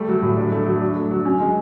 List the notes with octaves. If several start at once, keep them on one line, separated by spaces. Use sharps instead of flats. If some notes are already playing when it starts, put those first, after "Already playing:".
Already playing: G3 A3
F#3
A2
D4
A3
F#3
D4
A3
F#3
C#4
G#3